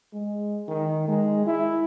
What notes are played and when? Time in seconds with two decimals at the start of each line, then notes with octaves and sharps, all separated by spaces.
0.14 G#3
0.68 D#3
1.08 G#3
1.46 E4